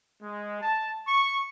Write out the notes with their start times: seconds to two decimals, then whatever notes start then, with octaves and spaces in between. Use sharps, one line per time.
0.22 G#3
0.61 A5
1.07 C#6